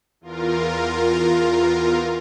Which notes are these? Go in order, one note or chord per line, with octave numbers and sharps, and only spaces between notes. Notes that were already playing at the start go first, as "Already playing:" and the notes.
E2 F4 A#4